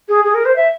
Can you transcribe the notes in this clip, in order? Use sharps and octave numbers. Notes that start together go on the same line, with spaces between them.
G#4
G#4
A#4
C5
E5